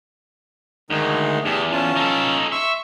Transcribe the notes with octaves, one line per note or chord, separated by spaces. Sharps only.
D2 D#3 G#3 D#4
E2 G4 G#4 A5
C#4 F4 A5
D#4 A4
E5 C6 C#6